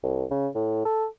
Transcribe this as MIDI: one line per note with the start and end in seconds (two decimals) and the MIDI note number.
0.03 0.25 36
0.31 0.48 49
0.55 0.84 45
0.85 1.06 69